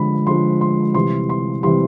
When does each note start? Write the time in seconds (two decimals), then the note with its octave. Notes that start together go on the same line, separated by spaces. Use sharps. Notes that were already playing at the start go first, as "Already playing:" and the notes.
Already playing: D3 F3 G#3 B5
0.27 D3 F3 G#3 C6
0.61 C6
0.94 C3 E3 G3 C6
1.29 C6
1.63 C3 E3 G3 C6